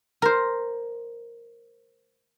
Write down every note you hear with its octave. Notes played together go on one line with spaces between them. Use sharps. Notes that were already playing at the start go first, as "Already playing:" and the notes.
A#4 C5